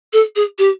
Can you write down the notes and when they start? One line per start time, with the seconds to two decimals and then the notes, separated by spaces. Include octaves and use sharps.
0.12 A4
0.35 G#4
0.58 G4